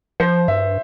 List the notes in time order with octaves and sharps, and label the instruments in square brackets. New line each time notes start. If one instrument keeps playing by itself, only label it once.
[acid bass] F3 [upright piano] C5
[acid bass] G2 [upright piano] E5